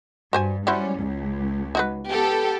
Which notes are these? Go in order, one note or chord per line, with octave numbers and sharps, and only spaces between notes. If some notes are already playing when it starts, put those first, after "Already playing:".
G2 F#4 C5 G#5
G3 C#4 E4 F#4 C5
C#2
D#4 F#4 B4
B3 G4 A4